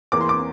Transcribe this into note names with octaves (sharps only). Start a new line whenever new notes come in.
E2 E3 A#3 D6
C6
D6